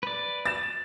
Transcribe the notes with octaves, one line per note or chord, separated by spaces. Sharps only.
B4 D5
A6 E7